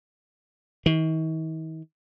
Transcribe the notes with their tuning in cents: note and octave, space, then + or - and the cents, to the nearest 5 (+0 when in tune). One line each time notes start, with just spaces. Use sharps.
D#3 +45